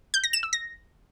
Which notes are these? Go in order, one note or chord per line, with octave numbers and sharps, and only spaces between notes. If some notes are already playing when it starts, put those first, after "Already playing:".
G6
A#6
E7
E6
A#6